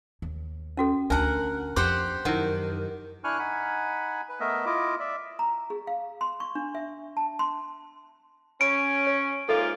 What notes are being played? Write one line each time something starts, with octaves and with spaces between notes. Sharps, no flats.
D#2
C#4 F#4 A4
D2 D4 A#4 F#5 A5
F2 G4 C5 F#5 C6
F#2 D#3 E4 A#4 F#5
D4 E4 G#5 C#6 F6 F#6
D#4 F#5 G#5 B5
B4
A3 B3 A#4 D#5 E5
E4 F4 D#5 D6
D5 E5
A#5
G#4
F5
C6
C#6
D4
E5
A5
C6
C#4 B5 D7
C#5
G#2 A#3 F4 A4 E5 D6